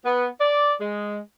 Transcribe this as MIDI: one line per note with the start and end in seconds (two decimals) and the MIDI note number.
0.05 0.26 59
0.39 0.72 74
0.80 1.18 56